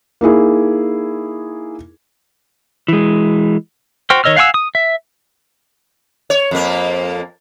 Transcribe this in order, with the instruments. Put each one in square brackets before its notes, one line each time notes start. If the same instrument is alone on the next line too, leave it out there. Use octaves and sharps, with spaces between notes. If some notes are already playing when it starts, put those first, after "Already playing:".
[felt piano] A#3 D#4 E4 G#4
[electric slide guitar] E3 G#3
[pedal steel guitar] F#4 C5 G5 F6
D#3 C#5 D#5 E6 F6
F5 F#5 G#5 C#6 E6
D#6
E5
[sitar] C#5
F2 A#3